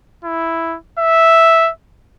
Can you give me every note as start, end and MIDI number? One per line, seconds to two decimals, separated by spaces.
0.24 0.78 64
0.99 1.70 76